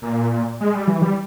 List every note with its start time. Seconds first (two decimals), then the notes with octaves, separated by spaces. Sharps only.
0.02 A#2
0.61 G#3
0.75 G3
0.87 E3
1.02 G3